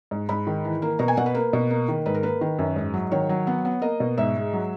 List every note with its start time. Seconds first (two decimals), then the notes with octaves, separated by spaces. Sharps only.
0.11 G#2
0.29 G#2 B5
0.47 D#3
0.65 E3
0.82 A#3
0.99 B2 A#5
1.08 G#5
1.17 B2 F#5
1.26 B4
1.35 A#3
1.53 B2
1.70 A#3
1.88 D#3
2.06 G#2 B4
2.15 A#4
2.23 A#3 B4
2.41 D#3
2.59 F#2
2.76 G#2
2.94 F#3
3.12 D#3 C#5
3.29 F#3
3.47 B3
3.65 B3
3.82 A#3 D#5
4.00 B2
4.18 G#2 E5
4.36 G#3
4.53 F#3